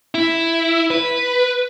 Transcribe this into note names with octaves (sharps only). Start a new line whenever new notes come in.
E4
B4